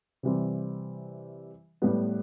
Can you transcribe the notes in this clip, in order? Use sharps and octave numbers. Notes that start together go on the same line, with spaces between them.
C3 E3 G3 C4
A2 G3 B3